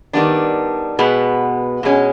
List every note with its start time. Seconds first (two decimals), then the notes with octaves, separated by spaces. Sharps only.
0.13 D#3 G3 B3 D4
0.99 B2 G#3 B3
1.83 B2 G#3 C#4